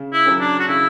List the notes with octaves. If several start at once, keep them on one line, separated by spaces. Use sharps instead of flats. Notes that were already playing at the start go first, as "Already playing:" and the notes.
Already playing: C#3
E4
F#3 C#4
D4
F#4
C#3 E4